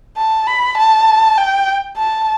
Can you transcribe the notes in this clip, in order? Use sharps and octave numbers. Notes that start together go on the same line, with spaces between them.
A5
B5
A5
G5
A5